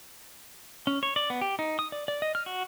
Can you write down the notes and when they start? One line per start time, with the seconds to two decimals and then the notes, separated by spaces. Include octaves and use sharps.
0.87 C#4
1.03 C#5
1.16 D5
1.30 B3
1.41 G4
1.59 D#4
1.79 D#6
1.92 D5
2.08 D5
2.22 D#5
2.35 F6
2.46 F#4